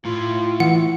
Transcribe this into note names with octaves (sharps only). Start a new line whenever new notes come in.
A2 F4
E3 F#5